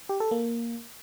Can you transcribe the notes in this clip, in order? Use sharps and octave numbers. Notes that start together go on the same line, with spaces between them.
G4
A4
A#3